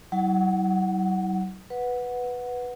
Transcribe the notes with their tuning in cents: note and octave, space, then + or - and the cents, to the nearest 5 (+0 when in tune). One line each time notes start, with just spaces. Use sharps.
F#3 +40 E4 -35 F#5 +0
B4 +0 F#5 -10